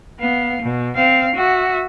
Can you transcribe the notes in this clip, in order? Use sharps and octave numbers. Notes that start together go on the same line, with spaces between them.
B3 F5
B2
C4 F5
F#4 E5